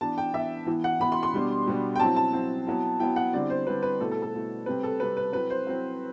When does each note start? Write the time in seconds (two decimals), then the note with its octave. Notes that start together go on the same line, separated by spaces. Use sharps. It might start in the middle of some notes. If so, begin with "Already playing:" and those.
0.01 E3 B3 D4 A5
0.18 G5
0.34 E3 B3 D4 E5
0.66 E3 B3 E4
0.84 F#5
1.00 E3 B3 E4 B5
1.12 C6
1.23 C6
1.33 B2 G3 B3 D4
1.66 B2 G3 B3 D4
1.95 G5
2.00 F#3 C4 E4 A5
2.16 A5
2.33 F#3 C4 E4
2.67 F#3 B3 E4
3.00 F#3 B3 E4 G5
3.16 F#5
3.33 D3 G3 C4 E4 D5
3.50 C5
3.67 D3 G3 C4 E4 B4
3.83 B4
4.00 B2 A3 E4 A4
4.11 A4
4.22 A4
4.33 B2 A3 E4
4.66 C3 G3 C4 B4
4.83 A4
4.99 C3 G3 C4 B4
5.17 B4
5.32 F#3 C4 E4 B4
5.50 C5
5.67 F#3 C4 E4